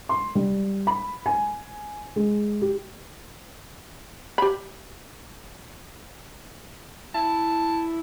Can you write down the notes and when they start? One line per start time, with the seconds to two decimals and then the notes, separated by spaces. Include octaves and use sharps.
0.09 C6
0.35 G3
0.87 B5
1.26 G#5
2.16 G#3
2.62 G4
4.38 G4 B5
7.14 E4 A5